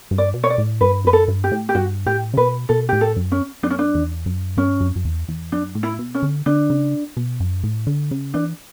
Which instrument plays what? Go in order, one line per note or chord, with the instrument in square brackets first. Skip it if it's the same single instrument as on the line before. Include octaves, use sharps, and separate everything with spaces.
[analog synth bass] G2
[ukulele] D5
[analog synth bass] B2
[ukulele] C#5
D5
[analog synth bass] A2
[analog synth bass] G2 [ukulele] B4
[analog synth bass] F#2 [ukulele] B4
[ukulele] A4
[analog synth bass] G2
[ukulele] G4
[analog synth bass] A2
[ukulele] G4
[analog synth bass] G2 [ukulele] F#4
[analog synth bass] A2 [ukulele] G4
[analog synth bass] C#3
[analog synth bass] B2 [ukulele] B4
[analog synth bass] B2 [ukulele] A4
[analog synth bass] A2 [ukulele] G4
[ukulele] A4
[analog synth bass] F#2
[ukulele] C#4
[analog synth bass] F#2 [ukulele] D4
[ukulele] C#4
D4
[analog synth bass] E2
F#2
[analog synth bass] G2 [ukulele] C#4
[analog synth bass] F#2
F#2
E2
E2
[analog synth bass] F#2 [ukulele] D4
[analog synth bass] A2
[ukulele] E4
[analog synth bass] B2
[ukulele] C#4
[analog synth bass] D3
[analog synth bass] D3 [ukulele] D4
[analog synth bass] C#3
B2
F#2
A2
D3
C#3
[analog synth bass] E3 [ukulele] D4